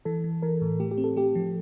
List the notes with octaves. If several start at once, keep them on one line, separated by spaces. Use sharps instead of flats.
E3 A4
E3
E3 A#4
A2
A3 G4
G4
C4
A4
A3 G4
F3